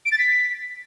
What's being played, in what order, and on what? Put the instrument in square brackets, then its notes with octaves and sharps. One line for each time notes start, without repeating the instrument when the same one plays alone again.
[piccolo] D7
A6
B6